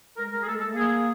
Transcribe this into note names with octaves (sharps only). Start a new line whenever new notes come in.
G#3 A#4
G#3 A#4
G#4
A3 A4
G#3
A4
A3
A#3 G#4